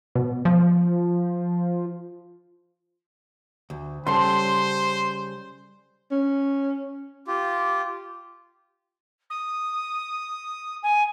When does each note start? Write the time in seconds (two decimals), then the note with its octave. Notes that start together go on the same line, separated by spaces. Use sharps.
0.15 B2
0.45 F3
3.70 D2
4.07 C#3 G3 A4 C5 C6
6.12 C#4
7.27 F4 G4
9.30 D#6
10.83 G#5